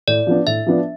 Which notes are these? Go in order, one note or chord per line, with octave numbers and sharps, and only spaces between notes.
A2 D5
F3 B3 D4
A2 E5
F3 B3 D4